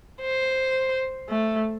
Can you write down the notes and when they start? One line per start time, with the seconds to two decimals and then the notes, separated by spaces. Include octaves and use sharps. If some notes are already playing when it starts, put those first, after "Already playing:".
0.21 C5
1.29 A3